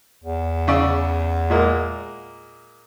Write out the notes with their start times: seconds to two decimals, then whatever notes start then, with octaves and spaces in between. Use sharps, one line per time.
0.24 E2
0.68 C#3 D5 E6
1.50 A#2 G#3 A#3